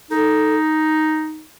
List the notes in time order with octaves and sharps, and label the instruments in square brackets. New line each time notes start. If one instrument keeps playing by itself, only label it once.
[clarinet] D#4 [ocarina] A4